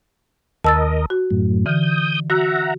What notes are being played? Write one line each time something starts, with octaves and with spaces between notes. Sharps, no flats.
D#2 A#4 D#5 A5 E6 A6
F#4
F#2 A2
D3 E3 D#6 G6
F#4 E5 F#5 A#5